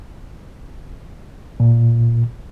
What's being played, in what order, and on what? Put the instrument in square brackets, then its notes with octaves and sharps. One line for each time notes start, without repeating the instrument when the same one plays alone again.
[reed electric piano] A#2